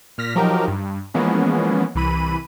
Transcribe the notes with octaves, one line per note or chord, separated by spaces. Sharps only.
A#2 F6 A#6 B6
F3 F#3 D#4 G4 A#4
G2
E3 F3 G#3 A#3 B3 C#4
C2 E3 B5 D#7